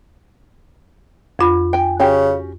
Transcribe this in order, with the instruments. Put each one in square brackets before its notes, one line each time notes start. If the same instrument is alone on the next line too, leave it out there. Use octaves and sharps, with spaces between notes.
[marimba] F2 F4 B5
[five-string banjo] G5 G#5
[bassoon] C#3 [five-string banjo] C#4 F#4 G4